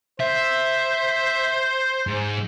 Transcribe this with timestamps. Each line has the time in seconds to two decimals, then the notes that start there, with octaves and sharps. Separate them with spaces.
0.20 C5 E5
2.07 G#2